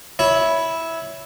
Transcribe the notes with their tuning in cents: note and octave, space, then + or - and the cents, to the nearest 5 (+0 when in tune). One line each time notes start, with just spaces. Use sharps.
E4 -10 C#5 +10